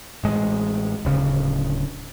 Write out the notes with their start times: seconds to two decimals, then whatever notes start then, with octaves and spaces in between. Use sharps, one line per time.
0.24 A1 G#3
1.05 D1 C#3